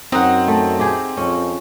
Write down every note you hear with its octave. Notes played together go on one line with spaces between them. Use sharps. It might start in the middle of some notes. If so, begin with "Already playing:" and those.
F#2 C4 D#4 F#5
A3
G4 G#4
F2 C#4